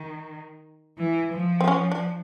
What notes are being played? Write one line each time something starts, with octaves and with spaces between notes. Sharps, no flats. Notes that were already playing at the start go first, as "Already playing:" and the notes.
Already playing: D#3
E3
F3
C4
C#4
D4